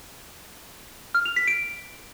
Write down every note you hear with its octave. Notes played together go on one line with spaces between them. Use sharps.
F6
F7
B6
D7